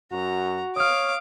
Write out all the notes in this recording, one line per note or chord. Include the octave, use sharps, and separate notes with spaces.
F#2 F#4 A#5
C#5 F5 D6 D#6 F6